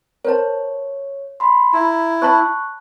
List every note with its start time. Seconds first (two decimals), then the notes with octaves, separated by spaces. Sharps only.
0.25 A#4 C5 C#5 A5
1.40 B5 C6
1.73 E4 A#5
2.22 C#5 A5 B5 C#6 F#6